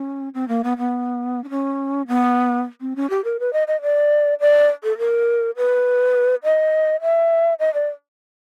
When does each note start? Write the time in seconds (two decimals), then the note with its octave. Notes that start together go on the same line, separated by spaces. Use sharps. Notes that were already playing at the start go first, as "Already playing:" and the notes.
Already playing: C#4
0.34 C4
0.48 A#3
0.64 B3
0.78 B3
1.44 D4
1.50 C#4
2.08 B3
2.81 C4
2.96 C#4
3.10 G4
3.24 A#4
3.40 B4
3.53 D#5
3.68 D#5
3.82 D5
4.41 D5
4.84 A4
4.98 A#4
5.57 B4
6.44 D#5
7.02 E5
7.59 D#5
7.74 D5